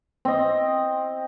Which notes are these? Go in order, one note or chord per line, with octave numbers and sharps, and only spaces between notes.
C4 D#5